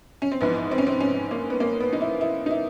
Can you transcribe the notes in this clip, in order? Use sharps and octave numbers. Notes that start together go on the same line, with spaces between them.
C#4
C4
A#1 G#2 E3 B3
C4
C#4
C4
C#4
A#3
B3
A#3
B3
D#4
E4
E4
D#4
E4